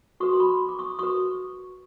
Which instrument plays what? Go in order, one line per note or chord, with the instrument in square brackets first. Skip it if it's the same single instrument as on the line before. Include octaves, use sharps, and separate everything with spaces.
[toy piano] F#4 B4 C#6 D#6
C6
B5 C#6
D6
C#6 D#6
F#4 B4 C#6 D#6